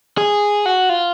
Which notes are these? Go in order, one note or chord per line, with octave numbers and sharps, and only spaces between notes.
G#4
F#4
F4